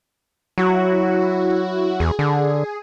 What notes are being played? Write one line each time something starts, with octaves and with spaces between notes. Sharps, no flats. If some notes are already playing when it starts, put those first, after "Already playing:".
F#3 E4 F#4
E2 G#4
D3 G#4